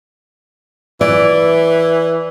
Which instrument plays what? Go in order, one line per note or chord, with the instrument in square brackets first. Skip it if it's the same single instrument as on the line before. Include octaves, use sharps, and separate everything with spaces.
[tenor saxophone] E3 [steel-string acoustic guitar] D5